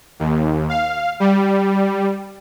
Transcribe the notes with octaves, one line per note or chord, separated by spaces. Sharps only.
D#2
F5
G3